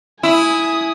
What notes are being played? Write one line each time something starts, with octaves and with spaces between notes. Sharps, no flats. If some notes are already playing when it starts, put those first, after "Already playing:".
E4 G#5 D#6